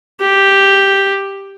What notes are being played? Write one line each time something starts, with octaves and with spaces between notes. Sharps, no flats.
G4